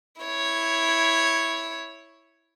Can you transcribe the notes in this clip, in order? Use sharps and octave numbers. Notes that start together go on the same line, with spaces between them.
E4 C#5